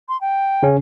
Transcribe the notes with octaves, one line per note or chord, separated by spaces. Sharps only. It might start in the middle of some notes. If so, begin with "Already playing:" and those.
C6
G5
C#3 C#4